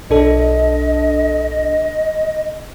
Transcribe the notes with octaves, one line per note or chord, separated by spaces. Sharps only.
B1 D4 A4 D#5